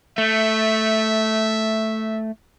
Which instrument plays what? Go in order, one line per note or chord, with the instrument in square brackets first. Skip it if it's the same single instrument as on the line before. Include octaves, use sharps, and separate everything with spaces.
[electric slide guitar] A3 [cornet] E5